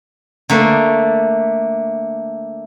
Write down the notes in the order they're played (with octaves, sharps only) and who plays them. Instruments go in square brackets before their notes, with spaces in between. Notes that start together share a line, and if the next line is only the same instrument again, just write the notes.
[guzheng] D3 A3 A#3